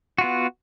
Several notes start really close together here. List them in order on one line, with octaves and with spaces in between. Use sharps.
F#4 F4 B3